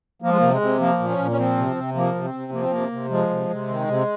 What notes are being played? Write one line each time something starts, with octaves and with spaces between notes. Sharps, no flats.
F3 A#3
G#3
C3 A#3
G#3
C3
F3 A#3
A#2
C#4
A#2
C#4
F3 C4
C3
C3
F3 A#3
C3
C4
C3
F3 A#3
C4
C3 A#3
C3
F3 G#3
C3
C3
D#3
C3